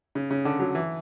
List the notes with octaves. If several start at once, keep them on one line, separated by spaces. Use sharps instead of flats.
C#3
C#3
D3
F#3
E3